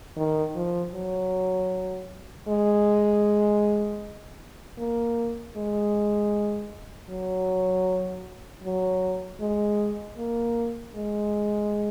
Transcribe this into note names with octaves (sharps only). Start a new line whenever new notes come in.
D#3
F3
F#3
G#3
A#3
G#3
F#3
F#3
G#3
A#3
G#3